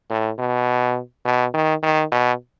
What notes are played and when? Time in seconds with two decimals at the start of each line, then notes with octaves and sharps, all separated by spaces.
0.10 A2
0.39 B2
1.25 B2
1.54 D#3
1.83 D#3
2.12 B2